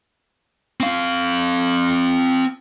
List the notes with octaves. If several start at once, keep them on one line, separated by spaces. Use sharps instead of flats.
C4 F5